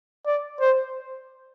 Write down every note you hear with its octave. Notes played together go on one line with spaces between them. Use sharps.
D5
C5